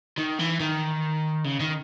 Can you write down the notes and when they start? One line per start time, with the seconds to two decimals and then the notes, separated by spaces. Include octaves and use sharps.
0.18 D#3
0.39 E3
0.60 D#3
1.44 C#3
1.60 D#3